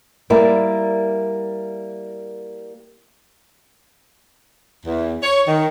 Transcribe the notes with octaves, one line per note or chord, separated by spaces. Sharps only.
G3 A#3 E4 A#4 D5
E2
C#5
D#3